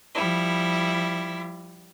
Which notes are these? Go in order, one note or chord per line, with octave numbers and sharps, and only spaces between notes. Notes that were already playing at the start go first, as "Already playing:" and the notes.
F3 G3 E4